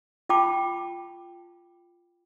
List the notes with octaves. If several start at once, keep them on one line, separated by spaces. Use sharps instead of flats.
F4 G5 A5 B5 D6